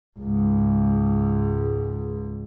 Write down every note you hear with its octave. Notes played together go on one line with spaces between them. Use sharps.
C#2 G#2